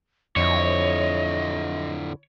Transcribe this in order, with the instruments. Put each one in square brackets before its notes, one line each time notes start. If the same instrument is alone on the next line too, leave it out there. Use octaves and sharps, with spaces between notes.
[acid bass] F2 [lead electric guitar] D3 E4 [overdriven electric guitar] C#5 [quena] D#5